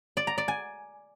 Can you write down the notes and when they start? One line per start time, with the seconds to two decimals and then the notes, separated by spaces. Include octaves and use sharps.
0.17 D5
0.27 A#5
0.38 D5
0.48 G#5